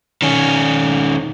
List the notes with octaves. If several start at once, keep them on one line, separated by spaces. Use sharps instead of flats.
D#3 C#4